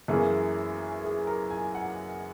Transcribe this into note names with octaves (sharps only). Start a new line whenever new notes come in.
F#2 E3 A#3 C#4 E4 G#4
G#4
A#4
G#5
F#5